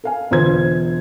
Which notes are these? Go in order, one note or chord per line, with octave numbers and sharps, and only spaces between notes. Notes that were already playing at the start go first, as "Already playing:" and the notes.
A4 F5 G#5
E1 D3 F4 B4 C5 G#6